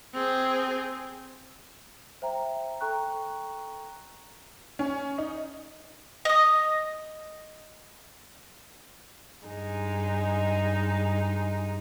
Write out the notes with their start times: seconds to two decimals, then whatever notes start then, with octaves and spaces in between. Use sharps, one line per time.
0.14 C4 G#4
2.22 C5 E5 G5 A#5
2.81 A4 G5 A#5 C#6 F#6
4.79 C#4
5.18 D#4
6.25 D#5 D#6
9.46 G2 G#3 D#4